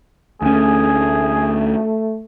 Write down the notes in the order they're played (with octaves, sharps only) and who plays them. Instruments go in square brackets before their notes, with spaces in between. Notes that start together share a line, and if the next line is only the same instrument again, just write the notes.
[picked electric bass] D2 C#4 [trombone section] A3 [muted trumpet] G#4